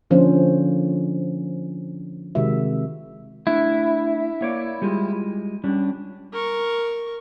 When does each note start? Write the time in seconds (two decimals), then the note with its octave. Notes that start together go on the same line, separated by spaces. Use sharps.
0.10 D3 F3 A#3 C#4 D4 C5
2.35 C3 D#3 G#3 F#4 E5
3.47 A3 D4 E4
4.41 A#3 C#5 D5
4.82 G3 G#3 F4
5.64 G3 C#4 D4
6.33 A#4 C#6